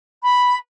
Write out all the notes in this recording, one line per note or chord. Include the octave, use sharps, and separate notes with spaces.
B5